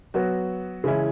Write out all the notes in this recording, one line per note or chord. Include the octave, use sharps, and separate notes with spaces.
F#3 B3 F#4
C#3 E3 G#3 C#4 E4